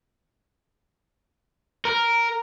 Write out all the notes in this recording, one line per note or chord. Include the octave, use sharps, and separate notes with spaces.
A#4